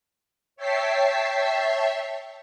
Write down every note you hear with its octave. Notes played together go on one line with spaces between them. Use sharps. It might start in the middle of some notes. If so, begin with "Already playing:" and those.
C#5 E5 G5 A5 B6 C7